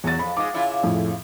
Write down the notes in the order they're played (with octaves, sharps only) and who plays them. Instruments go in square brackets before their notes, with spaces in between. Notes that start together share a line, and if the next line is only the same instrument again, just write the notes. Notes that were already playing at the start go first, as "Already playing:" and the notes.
[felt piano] E2 A6 [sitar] F#3
[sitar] F2 [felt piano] B5
[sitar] G#2 G#3 [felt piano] D6
[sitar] C#3 E4 F4
[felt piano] F2 A2